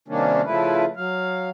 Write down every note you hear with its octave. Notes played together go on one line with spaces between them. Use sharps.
C3 D#3 G3 A#3 C#4 D4
C#3 F3 A3 E4 B4
F#3 F5